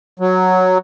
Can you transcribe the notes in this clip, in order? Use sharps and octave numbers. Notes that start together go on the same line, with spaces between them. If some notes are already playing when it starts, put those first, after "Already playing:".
F#3